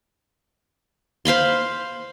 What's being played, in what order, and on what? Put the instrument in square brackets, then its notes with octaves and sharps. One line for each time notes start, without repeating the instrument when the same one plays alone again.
[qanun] C5 F5 B5 C6